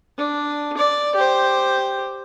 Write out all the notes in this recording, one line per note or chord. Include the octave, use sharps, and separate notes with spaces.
D4
D5
G4 C5